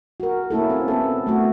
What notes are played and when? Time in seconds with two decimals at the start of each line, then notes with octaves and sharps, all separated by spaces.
0.20 F#4 A#4
0.50 A#3 C#4 E4 A4
0.70 C4
0.88 B3 A4
1.27 A3 F#4